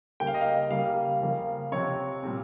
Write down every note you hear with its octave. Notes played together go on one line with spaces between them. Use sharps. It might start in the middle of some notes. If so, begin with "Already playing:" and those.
C#3 G3 A#3 G5
F5
D#5
F5
C#3 G3 A#3 F5
C#3 F3 A#3
C3 F3 C4 C#5
A#2 G3 C4